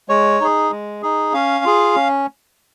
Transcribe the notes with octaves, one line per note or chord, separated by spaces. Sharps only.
G#3 C#5
D#4 G#4
G#3
D#4 G#4
C#4 F5
F4 G#4
C#4